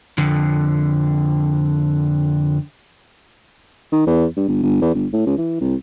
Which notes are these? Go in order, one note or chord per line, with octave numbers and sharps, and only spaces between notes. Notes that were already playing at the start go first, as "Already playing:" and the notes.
F2 D3
D#3
E2
G2
G1
G1
E2
G1
A2
C#2
E3
C2